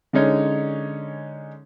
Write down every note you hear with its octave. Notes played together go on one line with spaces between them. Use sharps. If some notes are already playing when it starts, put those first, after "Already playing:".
D3 G#3 C#4 D#4 C#5